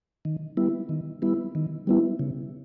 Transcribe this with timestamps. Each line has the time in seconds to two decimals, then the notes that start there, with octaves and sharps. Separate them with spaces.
0.25 D#3
0.57 G3 B3 E4
0.89 D#3
1.22 G3 B3 E4
1.55 D#3
1.87 G3 B3 E4
2.19 C#3